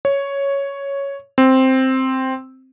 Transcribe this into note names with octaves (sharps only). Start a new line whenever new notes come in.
C#5
C4